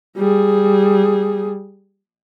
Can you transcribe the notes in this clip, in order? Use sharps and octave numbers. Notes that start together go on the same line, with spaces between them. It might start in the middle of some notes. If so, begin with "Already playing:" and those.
G3 G#4